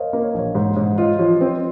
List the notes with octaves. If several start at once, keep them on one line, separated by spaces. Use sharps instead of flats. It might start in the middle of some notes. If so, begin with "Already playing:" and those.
Already playing: A#4 C5 C#5 D#5 F5
A#3
C#5
A#1 C#5
G#2 C5
G#2 C#5
F4 D#5
F3 C#5
C4 C5